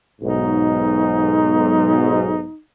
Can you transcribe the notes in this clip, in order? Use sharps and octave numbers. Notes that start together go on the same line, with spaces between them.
B1 G#2 D#4